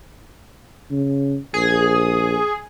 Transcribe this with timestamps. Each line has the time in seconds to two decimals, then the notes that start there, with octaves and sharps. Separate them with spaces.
0.91 C#3
1.54 A#1 G#4